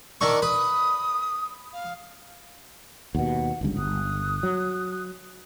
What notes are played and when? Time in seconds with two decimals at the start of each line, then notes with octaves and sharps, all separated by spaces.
0.21 D#3 D4 C#6 E6
0.42 B4 D#6
1.72 F5
3.15 D#2 B2 F#5
3.61 G1 C#2 G2
3.77 G1 D#6 F#6
4.43 F#3